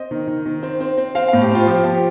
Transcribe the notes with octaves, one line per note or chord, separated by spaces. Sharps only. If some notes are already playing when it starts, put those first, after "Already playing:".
Already playing: C4 D#5
D#3
D#3
D#3
C4
C4
C4
C4 F5
A2 F5
G4
C4 F4
F3 G4
F3
G4